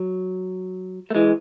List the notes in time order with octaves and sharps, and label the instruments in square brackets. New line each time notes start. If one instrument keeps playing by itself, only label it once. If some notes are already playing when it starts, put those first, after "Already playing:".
Already playing: [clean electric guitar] F#3
A3
E3 G#3